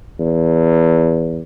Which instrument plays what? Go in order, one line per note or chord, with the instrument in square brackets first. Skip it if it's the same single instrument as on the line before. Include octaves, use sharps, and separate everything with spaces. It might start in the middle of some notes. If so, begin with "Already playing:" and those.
[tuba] E2